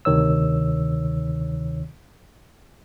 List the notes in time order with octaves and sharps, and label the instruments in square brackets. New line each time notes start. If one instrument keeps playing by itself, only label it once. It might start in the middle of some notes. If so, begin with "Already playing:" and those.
[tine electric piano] D2 C3 D#3 C#5 E6